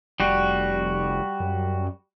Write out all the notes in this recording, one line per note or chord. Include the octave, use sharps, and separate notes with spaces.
F1 G3 F#4
F#2